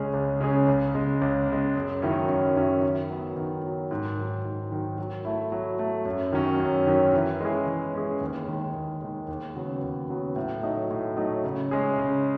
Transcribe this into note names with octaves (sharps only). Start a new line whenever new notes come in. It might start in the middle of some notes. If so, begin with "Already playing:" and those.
Already playing: C#2 C#3 G#3 C#4 G#4
C#2
C#3 G#3 C#4 G#4
C#2
C#3 G#3
C#2
C#3 G#3
F#2
D#3 F#3 C#4 E4
F#2
D#3 F#3 C#4 E4
D#3
F#3 B3
D#3
F#3 B3
G#2
D#3 F#3
G#2
D#3 F#3
F#3
A3 E4
F#3
A3 E4
F#2
D#3 F#3 C#4
F#2
D#3 F#3 C#4
E3
G#3 C#4 E4 G#4
E3
G#3 C#4 E4 G#4
D#2
D#3 G#3
D#2
D#3 G#3
D#2
C#3 F#3 B3
D#2
C#3 F#3 B3
A2
F#3 A3 D#4
A2
F#3 A3 D#4
C#3
G#3 C#4 G#4
C#3